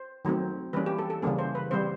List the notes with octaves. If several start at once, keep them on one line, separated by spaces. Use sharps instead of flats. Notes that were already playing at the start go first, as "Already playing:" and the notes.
Already playing: C5
D#3 F#3 A3 C4
E3 G3 A#3 C#4 B4
G4
A4
A4
C#3 E3 G3 A#3 C#4 G#4
C5
B4
E3 G3 C4 C5